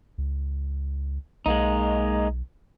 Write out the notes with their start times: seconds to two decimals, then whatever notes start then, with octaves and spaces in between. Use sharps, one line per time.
0.18 C#2
1.46 B1 G#3 A#3 D#4